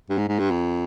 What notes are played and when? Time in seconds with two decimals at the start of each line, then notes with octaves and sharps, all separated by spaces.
0.10 G2
0.18 G#2
0.28 G#2
0.39 G2
0.51 F2